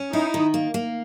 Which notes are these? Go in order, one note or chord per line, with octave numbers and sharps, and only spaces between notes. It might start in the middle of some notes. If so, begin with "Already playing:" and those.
Already playing: C#4
D#4 E4
D#3
A#3
A#3